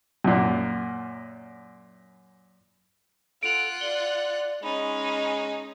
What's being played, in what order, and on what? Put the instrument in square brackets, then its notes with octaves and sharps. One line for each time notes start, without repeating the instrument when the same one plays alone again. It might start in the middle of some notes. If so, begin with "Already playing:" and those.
[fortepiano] F#2 A#2
[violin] F4 F#5 [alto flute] A4 [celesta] D7 F7
[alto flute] D5 [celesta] G7
[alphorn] G#3 [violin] C#4 D#4 [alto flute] B5